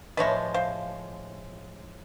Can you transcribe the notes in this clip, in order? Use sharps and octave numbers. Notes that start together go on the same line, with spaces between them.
A2 F3 G#3 B4 C#5 D#5 E5
C5 F5